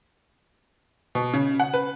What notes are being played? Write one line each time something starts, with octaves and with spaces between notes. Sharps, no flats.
B2
C#3
F#5
B4